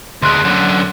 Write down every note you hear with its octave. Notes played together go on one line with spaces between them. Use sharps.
D2 G#3 C6 F#6
F#2 D3